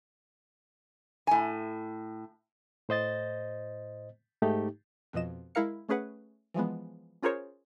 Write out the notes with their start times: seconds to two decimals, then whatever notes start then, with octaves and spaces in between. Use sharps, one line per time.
1.27 A2 G#5
2.89 A2 C5 D#5 A6
4.42 G#2 A3 D#4 G4
5.13 F2 B2 F3 D#5 E7
5.55 G#3 E4 A#4 F5 C#7
5.89 A3 C#4 G#4 B4 F#5
6.54 E3 F3 G#3 B3
7.23 C#4 F4 G#4 A#4 C5 C#5